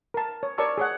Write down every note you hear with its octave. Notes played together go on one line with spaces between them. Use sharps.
A#4 A5
C#5
A#4 C#5 D5 A5 C#6 E6
G#4 C#5 F#5